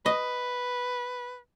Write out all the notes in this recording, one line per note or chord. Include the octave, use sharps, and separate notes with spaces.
B4 D#5